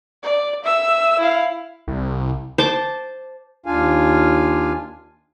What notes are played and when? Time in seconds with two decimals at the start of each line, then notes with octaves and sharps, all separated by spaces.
0.23 D5
0.64 E5 E6
1.19 E4 F5
1.87 C2
2.58 C5 A5 D6
3.66 D#2 D4 F4 F5 G#5